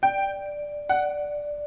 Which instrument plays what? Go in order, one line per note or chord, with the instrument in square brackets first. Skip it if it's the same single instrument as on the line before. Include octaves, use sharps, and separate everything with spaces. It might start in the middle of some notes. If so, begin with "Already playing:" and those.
[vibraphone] D5 [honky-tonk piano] G5
[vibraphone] D5
[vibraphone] D5 [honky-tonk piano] F#5